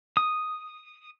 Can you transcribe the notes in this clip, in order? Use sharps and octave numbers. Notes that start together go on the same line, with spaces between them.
D#6